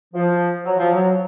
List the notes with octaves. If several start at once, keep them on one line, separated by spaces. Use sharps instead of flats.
F3
F#3
F3
F#3